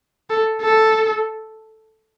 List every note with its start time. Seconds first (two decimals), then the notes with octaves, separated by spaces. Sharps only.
0.30 A4
0.62 A4